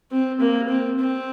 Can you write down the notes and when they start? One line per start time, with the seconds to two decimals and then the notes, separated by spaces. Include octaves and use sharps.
0.12 C4
0.40 A#3
0.69 C4
0.99 C4